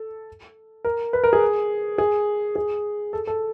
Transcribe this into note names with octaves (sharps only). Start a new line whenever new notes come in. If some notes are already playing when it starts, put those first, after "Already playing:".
Already playing: A4
A#4
B4
A#4
G#4
G#4
G#4
A4
A4